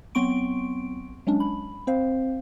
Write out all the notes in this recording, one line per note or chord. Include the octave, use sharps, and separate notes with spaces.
F#3 B3 C4 C6 C#6 D7
F#3 G#3 C#4 D4
B5
C4 C5 F5